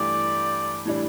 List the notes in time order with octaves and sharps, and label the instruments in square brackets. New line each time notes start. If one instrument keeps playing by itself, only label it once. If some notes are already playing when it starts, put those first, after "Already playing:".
Already playing: [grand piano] G2 E3 A3 G4 [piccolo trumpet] D5
[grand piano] A2 E3 G3 D4